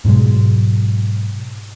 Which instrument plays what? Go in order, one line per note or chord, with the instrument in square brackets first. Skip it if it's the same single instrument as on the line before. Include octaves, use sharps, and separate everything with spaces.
[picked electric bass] G#2 B2 F#3 G#3